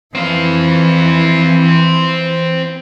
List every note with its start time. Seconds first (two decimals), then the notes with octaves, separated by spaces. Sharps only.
0.15 E3 C4 F5